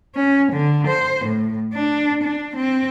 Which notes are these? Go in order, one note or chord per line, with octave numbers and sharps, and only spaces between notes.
C#4
D3
C5
A2
D4
D4
C4